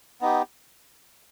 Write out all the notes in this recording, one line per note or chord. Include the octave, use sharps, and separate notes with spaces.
B3 D#4 G4